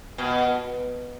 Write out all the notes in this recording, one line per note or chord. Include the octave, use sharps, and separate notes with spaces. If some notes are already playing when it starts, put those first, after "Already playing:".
B2